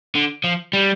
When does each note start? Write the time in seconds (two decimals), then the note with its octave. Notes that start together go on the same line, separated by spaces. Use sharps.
0.15 D3
0.44 F3
0.73 G3